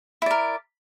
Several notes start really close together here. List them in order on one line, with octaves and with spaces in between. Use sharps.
E4 D5 A#4